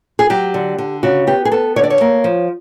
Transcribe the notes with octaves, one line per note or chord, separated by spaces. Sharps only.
G#4
F#3 G4
D3
D3
C#3 F#4
B3 G4
G#4
B3 A4
D3 C#5
D5
C#5
A#3
F3